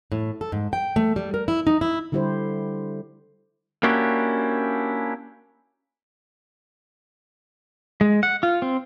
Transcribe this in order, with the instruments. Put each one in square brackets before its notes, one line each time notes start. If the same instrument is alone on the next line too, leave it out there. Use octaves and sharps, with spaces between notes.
[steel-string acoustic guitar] A2
A4
G#2
G5
A3
G3
A#4
E4
D#4
E4
[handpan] D3 G3 E4 G4 C5
[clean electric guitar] A#3 C#4 D4 E4 F#4 G4
[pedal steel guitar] G#3
F#5
F4
C4